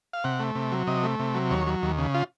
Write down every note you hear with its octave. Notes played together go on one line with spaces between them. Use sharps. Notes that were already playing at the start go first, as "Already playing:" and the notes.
F5
C3 F#5
A3
C3
F#3
C3 D#5
A3
C3
F#3
D#2 C#5
F#3
D#2
C#3
F4